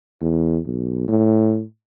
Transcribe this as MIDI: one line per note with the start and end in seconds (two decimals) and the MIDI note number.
0.21 0.59 40
0.66 1.05 35
1.08 1.63 45